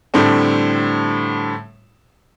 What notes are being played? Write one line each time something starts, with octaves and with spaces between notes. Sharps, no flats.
A2 D3 G3 A3 C4